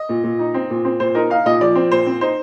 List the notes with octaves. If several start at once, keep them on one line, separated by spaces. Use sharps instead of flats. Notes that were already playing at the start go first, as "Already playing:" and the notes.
Already playing: D#5
A#2
A#2
D#4
C4
A#2
C4
A#2 C5
D#4 A#4
D#4 F5
A#2 D#5
F3 D5
C4
A#2 C5
C4
D#4 C5